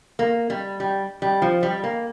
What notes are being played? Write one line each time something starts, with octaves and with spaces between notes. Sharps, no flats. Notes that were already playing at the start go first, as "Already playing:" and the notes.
A#3
G3
G3
G3
F3
G3
A#3